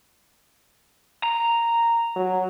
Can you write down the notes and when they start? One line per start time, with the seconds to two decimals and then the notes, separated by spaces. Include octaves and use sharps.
1.23 A#5
2.16 F#3